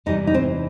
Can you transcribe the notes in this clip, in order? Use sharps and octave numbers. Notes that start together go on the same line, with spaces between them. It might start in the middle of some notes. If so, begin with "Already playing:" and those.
E2 C3 E3 G3 D#4
D#4
C4